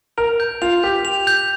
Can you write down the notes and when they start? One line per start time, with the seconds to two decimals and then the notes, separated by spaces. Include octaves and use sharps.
0.17 A#4 F7
0.40 G6
0.62 F4 F7
0.83 G4 G6
1.05 F7
1.27 G6